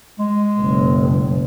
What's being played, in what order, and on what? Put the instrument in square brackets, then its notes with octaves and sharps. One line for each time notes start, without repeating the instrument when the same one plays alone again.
[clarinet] G#3
[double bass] F#1 B1